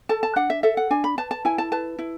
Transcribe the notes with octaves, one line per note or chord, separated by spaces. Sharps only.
A4 A5
A5
D4 F#5
E5
A4 E5
F#5
D4 G#5
B5
B4 A5
A5
E4 G#5
A5
B4 A5
E4